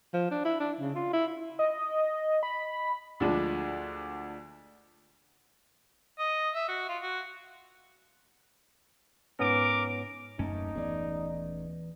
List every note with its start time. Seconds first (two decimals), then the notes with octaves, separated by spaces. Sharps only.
0.14 F3
0.31 D4
0.45 E4
0.60 D4
0.80 C#3
0.96 F4
1.13 E4
1.59 D#5
2.43 B5
3.20 D2 F3 G#3 D4
6.19 D#5
6.55 E5
6.68 F#4
6.89 F4
7.02 F#4
9.39 G#2 B3 C#4 A#4 D6
10.39 D#1 F#2 A3 A#3 C#4 D#4 A5
10.75 E3 B3 G#4 D5